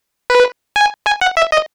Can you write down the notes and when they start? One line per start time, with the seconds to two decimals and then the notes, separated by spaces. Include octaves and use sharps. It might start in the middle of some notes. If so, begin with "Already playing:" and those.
0.30 B4
0.76 G#5
1.06 G#5
1.21 F#5
1.37 E5
1.52 D#5